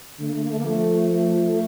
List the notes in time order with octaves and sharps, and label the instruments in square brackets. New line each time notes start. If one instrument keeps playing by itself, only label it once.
[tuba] D3 [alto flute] A3
[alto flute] A#3
A3
A#3
A3
A#3
[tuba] F3 [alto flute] A3
[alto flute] A3